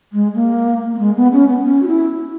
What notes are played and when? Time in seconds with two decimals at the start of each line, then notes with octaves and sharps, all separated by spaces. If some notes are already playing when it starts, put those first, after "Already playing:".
0.13 G#3
0.34 A#3
0.93 A#3
0.99 G#3
1.16 B3
1.33 C#4
1.48 B3
1.65 C#4
1.82 F#4
1.88 E4